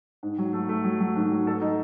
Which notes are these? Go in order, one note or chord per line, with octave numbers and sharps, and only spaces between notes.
G#2
F#3
A3
A3
F#3
F#3
G#2
F#3
A4
D#4